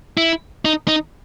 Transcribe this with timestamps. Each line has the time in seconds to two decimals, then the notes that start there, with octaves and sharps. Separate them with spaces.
0.17 E4
0.65 D#4
0.88 D#4